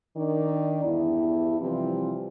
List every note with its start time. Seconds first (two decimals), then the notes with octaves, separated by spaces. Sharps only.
0.17 D#3 D4 D5
0.84 E2 G2 B3 E4
1.60 C3 E3 F3 G3 C4